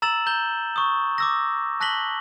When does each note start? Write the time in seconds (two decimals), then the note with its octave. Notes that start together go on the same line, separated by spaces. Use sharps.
0.02 A#5 E6 A6 E7 F#7
0.26 A#5 G6 G7
0.76 C#6 D#6
1.18 D6 E6 A#6
1.80 A5 F#6 A#6 B6 F#7 G7